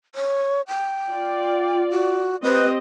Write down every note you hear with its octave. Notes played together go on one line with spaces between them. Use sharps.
C#5
G5
F4 D5
F#4
C4 G4 B4 D#5